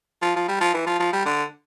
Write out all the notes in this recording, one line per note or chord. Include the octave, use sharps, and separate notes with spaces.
F3
F3
G3
F3
E3
F3
F3
G3
D3